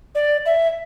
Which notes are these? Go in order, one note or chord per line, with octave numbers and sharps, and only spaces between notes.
D5
E5